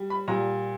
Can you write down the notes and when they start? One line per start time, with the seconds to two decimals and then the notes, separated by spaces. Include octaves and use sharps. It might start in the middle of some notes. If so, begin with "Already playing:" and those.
Already playing: G3
0.10 B5
0.28 A#2 G3 A#5